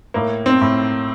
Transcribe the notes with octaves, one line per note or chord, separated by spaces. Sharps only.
A2 A#3
C4
A2